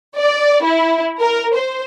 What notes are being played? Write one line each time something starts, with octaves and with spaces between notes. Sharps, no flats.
D5
E4
A#4
C5